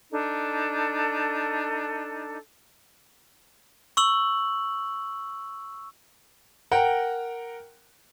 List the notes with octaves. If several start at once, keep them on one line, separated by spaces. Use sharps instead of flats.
D4 D#4 A4
C#6 E6 F#7
A#4 F#5 G5 A#5